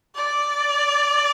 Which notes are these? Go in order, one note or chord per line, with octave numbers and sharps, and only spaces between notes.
D5